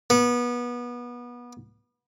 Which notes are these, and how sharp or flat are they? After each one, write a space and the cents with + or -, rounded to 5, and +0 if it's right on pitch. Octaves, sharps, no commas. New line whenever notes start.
B3 -25